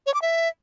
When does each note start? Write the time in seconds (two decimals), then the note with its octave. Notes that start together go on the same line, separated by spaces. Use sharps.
0.06 C#5
0.14 D6
0.22 E5